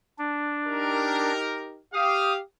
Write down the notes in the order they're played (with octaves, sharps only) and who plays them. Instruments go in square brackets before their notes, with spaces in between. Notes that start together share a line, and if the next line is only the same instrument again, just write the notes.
[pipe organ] D4
[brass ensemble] D#4 G4 A#4
[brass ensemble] G4 F5 [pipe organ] D#6